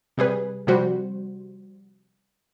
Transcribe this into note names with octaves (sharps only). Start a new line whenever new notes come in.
C3 G3 G#4 B4
C3 F3 G3 F#4 C5